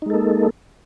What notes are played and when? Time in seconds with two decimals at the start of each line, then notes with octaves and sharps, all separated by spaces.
0.02 D#4
0.06 G#3
0.10 A4
0.14 A#3